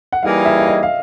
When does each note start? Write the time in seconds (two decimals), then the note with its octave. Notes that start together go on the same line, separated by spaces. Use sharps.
0.13 F#5
0.23 E3 G3 A#3 D#4 G#4 F5
0.46 E5
0.59 E5
0.68 D#5
0.83 F5